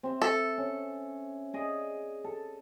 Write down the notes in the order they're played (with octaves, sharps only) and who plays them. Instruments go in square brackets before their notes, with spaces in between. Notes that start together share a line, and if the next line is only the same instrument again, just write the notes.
[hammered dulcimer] C4 E5
[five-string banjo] A4
[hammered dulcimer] C#4
G#4 D5 D#5
A4